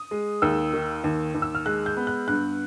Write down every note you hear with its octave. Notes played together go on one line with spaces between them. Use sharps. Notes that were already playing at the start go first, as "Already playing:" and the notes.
Already playing: D#6
G#3
D#2 E6
D#3
D#2
D#2
E6
F6
G#3 F#6
G6
B3
F#6
G2 F#6